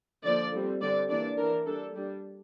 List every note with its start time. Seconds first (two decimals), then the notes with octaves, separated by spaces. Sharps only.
0.24 D3 F3 A#3 D5
0.53 D3 G3 C4
0.81 D3 G3 C4 D5
1.10 E3 A#3 D4 D5
1.38 E3 A#3 D4 A#4
1.66 G3 D4 A4
1.95 G3 D4